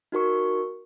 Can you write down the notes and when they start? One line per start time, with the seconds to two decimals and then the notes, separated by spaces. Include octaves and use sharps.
0.12 D#4 F#4 A#4 C#6